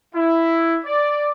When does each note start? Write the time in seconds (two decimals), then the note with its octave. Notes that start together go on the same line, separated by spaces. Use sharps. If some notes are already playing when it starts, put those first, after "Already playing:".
0.14 E4
0.85 D5